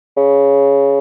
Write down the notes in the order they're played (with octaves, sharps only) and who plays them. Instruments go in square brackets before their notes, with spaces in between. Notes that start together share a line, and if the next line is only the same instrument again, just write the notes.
[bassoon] C#3